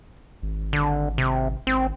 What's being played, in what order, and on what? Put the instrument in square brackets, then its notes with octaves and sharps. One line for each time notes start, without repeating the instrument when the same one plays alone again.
[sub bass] G#1
[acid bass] D3
C3
[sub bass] G#1 [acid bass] C4